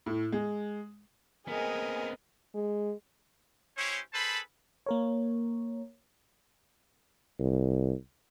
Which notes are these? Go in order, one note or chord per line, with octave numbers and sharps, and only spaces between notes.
A2
G#3
B3 C4 G#4 A#4 D#5 G#5
G#3
C#4 E4 G4 C5 C#5
G#4 A4 B4 C5 A5 B5
A#3 A#4 C#5
C2